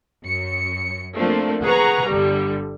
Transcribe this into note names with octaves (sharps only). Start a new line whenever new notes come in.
F#2 C#7
F3 A3 A#3 C4 D4
G#4 B4 F#5 A#5 C#6
G1 D3 G3